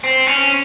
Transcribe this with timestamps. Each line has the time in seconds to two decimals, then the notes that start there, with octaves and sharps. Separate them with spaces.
0.04 C4
0.27 C#4